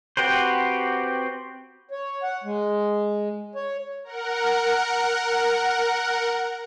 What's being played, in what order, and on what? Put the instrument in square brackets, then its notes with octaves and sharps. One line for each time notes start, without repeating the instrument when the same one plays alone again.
[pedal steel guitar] C4 F#4 G4 B4 C5
[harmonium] C#5
F#5
G#3
C#5
[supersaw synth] A#4 F#5